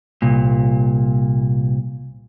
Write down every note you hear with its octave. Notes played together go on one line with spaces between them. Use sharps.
C2 A#2